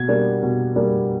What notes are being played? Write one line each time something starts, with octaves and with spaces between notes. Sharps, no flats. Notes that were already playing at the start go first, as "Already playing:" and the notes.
Already playing: B2 G#6
G3 A#3 D4
B2
G3 A#3 D4